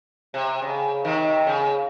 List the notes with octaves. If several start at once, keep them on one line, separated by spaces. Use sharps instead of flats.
C3
C#3
C3 D#3
C#3